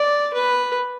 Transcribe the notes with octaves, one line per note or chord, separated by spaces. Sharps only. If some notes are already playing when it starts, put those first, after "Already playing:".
Already playing: D5
B4